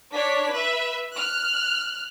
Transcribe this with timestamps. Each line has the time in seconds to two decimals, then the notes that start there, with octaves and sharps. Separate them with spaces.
0.12 D4 C#5 B6
0.51 B4 E5
1.13 F6 F#6